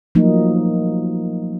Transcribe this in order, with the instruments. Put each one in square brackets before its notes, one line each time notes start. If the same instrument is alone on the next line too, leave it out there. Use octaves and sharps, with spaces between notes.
[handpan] F3 F#3 A3 A#3 D#4